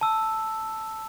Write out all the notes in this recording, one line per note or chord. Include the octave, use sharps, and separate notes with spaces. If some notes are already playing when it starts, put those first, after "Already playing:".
A5 E6